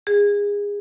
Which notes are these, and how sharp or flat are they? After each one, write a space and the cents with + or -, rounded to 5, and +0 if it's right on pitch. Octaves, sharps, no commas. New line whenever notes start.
G#4 -25